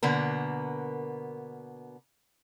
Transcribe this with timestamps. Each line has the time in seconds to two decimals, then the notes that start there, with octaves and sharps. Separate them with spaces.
0.03 B2 D3 A#3 B3 A#4